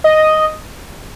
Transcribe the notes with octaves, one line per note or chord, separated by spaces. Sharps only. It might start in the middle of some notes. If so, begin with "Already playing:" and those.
D#5